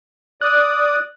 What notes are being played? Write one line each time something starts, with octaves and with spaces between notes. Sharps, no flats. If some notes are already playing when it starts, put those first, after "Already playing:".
D5 D#6 F#6